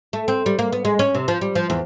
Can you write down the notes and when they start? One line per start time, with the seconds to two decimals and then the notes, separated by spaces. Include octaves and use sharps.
0.13 A3
0.28 C4
0.46 G3
0.59 A#3
0.73 B3
0.85 G#3
0.99 C#4
1.15 C3
1.28 F3
1.41 G3
1.55 F3
1.70 E2